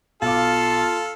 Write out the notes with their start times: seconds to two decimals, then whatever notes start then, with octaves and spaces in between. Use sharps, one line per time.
0.22 B1 F4 A4 F5 A5 D6